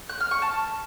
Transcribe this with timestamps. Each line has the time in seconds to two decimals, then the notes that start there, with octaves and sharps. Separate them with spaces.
0.09 F#6
0.20 F6
0.31 C#6
0.42 A5